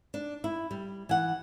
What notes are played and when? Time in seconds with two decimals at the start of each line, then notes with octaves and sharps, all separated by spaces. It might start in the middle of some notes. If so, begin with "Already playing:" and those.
0.14 D4
0.44 E4
0.71 G3
1.09 E3 F#5